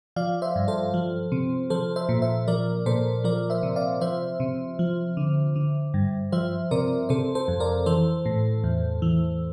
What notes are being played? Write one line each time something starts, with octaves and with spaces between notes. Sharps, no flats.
F3 D5 F5
C5 E5
G2
A4 C5
F3
C3
F3 A4 C5
C5 E5
A#2
C5 E5
F3 A#4 D5
A#2 A4 C5
F3 A#4 D5
C5 E5
C3
D5 F5
F3 C5 E5
C3
F3
D3
D3
G2
F3 C5 E5
C3 A#4 D5
C3 A4 C5
A4 C5
F2
A#4 D5
E3 A4 C5
A2
E2
E3